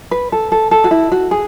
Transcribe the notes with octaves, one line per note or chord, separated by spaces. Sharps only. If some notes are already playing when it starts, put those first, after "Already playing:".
B4
A4
A4
A4
F#4
E4
F#4
G#4